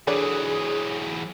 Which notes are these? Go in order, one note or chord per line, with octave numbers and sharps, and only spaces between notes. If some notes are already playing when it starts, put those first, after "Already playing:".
D3 E3 F#3 G#4 C#5 D5